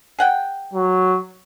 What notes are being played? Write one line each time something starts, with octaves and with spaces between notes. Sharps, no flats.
G#4 F#5 G5
F#3